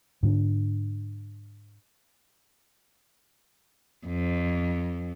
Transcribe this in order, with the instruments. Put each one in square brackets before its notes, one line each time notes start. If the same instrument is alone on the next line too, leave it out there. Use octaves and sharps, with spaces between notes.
[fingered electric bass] G#2 D3 D4
[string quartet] F2